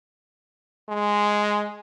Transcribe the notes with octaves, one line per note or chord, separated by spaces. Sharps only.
G#3